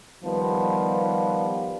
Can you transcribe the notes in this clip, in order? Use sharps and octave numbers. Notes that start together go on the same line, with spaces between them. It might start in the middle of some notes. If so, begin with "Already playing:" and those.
D#3 F3 G3 B3